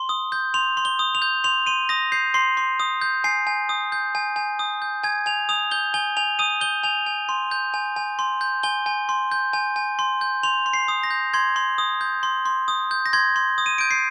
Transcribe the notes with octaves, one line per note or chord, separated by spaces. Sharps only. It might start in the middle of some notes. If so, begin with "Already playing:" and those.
Already playing: C6 G7
D#6
G6
C6 F7
C6
G7
D#6
F7
G6
C6 F7
C6 D#7
D#6 A#6
G6 C7
C6 C7
C6
D#6
G6
G#5 C7
G#5
D#6
G6
G#5
G#5
D#6
G6
G#5 G#6
G#5 F7
D#6 F7
G6 G7
G#5 G7
G#5 F7
D#6 D#7
G6 G7
G#5 F7
G#5
C6
G6
G#5
G#5
C6
G6
G#5 G7
G#5
C6
G6
G#5
G#5
C6
G6
C6 F7
C6
C7
D#6
A#6
G6
C6 G#6
C6
D#6
G6
C6
C6
D#6
G6
A#6
C6 G#6
C6
D#6
D#7
G6 D7
C7